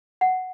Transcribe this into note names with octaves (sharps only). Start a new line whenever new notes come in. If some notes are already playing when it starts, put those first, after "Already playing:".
F#5